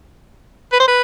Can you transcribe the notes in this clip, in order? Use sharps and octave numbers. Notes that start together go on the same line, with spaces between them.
B4
C5
B4